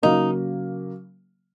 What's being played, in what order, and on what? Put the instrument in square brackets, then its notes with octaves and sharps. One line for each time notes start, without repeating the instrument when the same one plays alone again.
[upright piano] C#3 F#3 A#3 [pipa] D#4